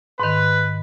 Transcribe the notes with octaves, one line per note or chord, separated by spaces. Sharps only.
G#2 D#3 B4